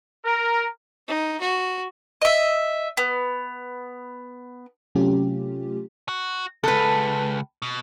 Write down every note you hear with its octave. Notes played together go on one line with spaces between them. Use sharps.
A#4
D#4
F#4
D#5 E5
B3
C3 F#3 A3 C#4 F4 G4
F#4
C#2 A4 B4
B2